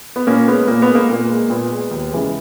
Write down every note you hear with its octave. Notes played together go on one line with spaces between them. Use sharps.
B3
A#2 A#3 C#4
G#3 B3
A#2 A#3
B3
G#3
A#3
A#2 A#3
G#3
A#2 B3
G#3
D#2
C#3 E3 G#3